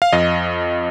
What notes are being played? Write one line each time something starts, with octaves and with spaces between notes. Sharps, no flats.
F5
F2 D#5